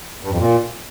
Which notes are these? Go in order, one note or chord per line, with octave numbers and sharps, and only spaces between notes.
G2
F2
A#2